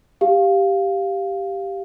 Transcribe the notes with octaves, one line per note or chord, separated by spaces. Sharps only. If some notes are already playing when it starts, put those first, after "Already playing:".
G4 F5